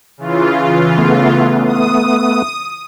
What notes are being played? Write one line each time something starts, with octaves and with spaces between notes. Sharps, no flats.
C#3 E3 F4
A3 B3
D#6